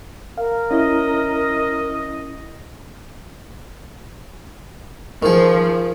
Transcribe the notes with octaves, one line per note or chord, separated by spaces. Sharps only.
A#4 F5
C#4 E4 D#5
D#3 F3 G#4